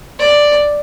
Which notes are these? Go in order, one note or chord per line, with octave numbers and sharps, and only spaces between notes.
D5